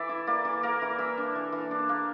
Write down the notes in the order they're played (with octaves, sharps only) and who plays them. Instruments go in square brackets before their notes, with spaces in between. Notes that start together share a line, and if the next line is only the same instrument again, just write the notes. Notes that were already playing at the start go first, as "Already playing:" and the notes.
Already playing: [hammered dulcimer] E3 D5 E5
E4
A#3 D5
E3
A#3 A#4
E3
E3 E5
D4
E3
E3
D4
A#3